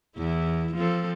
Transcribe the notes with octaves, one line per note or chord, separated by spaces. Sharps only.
E2 E4
F3 C4 A4